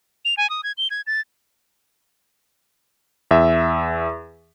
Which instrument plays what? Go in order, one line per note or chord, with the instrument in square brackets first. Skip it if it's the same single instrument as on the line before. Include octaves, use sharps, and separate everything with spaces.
[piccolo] F7
G#5
D#6
G#6
G7
G#6
A6
[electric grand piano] E2 E5